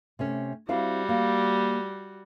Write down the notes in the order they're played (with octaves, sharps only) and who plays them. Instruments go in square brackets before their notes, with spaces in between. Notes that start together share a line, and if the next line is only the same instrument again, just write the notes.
[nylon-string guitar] C3 A3 C#4
[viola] G3 F#4 [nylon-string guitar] C4 E4 F5
[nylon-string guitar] A#3